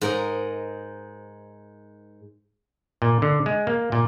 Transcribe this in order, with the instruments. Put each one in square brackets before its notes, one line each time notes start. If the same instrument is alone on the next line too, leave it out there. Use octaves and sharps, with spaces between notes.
[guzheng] G#2 A#4 D#5
[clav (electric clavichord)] A#2
D3
G#3
A#3
A#2